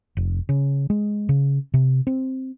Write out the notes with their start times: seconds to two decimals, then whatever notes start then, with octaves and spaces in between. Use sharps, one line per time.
0.17 F1
0.49 C#3
0.90 G#3
1.29 C#3
1.74 C3
2.07 C4